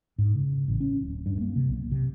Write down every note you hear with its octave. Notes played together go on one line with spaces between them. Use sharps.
G#2
C#3
A1
C#4
D1
G2
A#3
C3
B1
C3